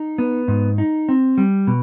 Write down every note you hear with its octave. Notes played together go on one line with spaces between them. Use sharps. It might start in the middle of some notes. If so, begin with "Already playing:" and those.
Already playing: D#4
B3
G#2
D#4
C4
G3
B2